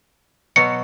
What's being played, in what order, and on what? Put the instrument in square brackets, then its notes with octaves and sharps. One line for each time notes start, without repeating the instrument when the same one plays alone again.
[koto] B2 F#3 [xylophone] C#7